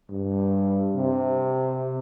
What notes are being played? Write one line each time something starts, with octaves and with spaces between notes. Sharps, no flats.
G2
C3